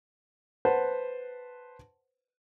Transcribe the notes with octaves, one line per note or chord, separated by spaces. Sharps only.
B4 C5 F#5 A5